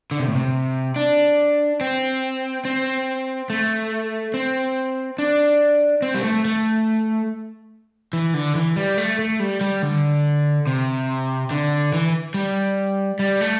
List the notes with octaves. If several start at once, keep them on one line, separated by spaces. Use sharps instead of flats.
D3
C3
A2
C3
D4
C4
C4
A3
C4
D4
C4
G3
A3
A3
E3
D3
E3
G3
A3
A3
G3
G3
D3
C3
D3
E3
G3
G3
A3